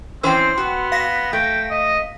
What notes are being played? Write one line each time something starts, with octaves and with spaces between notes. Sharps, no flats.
E3 C4 C#4 C5 G5 C6 E6
B3 F#4
F5 A#6 B6
A3 G5
D#5